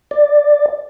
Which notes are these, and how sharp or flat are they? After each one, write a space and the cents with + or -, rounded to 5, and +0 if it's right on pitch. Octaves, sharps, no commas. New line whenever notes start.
D5 +5